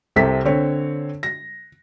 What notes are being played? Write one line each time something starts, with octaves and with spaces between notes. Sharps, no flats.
C2 C3 C4 A4 B6
D3 C4 C#5
A#6